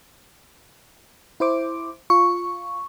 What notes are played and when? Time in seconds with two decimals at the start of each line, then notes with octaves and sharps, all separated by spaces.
1.40 E4 C5 D6
2.10 F4 C#6